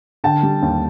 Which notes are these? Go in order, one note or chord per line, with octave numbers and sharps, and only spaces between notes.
D3 G5 A5
G3
D#2